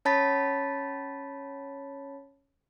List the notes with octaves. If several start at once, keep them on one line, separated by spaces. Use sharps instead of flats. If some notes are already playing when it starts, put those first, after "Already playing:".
C#4 C#5 A5 B5 A6 B6